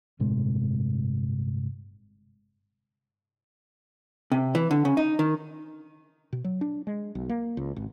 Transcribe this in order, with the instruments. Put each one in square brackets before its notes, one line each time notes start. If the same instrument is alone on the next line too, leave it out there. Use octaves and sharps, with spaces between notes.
[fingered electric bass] G1 A2 C3 G#3
[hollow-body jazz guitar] C3
E3
D3
C#3
D#4
D#3
[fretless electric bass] B2
F#3
D4
G#3
B1
A#3
C#2
G#1